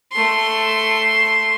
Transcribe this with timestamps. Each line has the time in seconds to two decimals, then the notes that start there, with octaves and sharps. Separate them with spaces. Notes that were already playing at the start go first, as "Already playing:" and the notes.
0.12 A3 C6